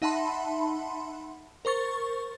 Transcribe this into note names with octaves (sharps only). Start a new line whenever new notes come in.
D#4 E5 F#5 A5 B5 C6
A#4 C5 C#6 A6